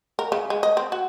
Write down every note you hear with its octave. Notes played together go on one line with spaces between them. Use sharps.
A#4
C#3
G#3
D#5
C4
F#4